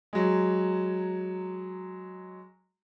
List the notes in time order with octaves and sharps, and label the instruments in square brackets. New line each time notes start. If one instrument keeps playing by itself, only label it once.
[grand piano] F#3 G#3